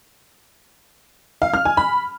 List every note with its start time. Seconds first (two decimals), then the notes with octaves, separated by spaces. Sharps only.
1.42 F5
1.54 F6
1.65 G#5
1.77 B5